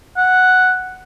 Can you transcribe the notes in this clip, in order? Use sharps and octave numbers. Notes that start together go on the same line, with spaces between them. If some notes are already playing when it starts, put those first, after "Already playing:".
F#5